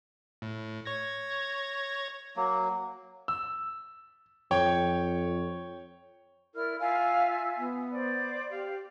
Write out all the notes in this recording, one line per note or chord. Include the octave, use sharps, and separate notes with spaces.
A2
C#5 G#6 A#6
F#3 A#3
E6
F2 C#5 G5 C#6
E4 A#4 D5 F6
F4 E5 F5 G#5
B3
C5 D5
G4 F5